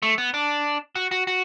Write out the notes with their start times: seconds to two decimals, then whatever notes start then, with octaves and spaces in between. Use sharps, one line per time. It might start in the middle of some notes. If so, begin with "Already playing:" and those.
0.03 A3
0.18 B3
0.34 D4
0.96 F#4
1.11 F#4
1.27 F#4